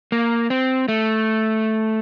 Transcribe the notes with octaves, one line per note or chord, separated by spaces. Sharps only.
A#3
C4
A3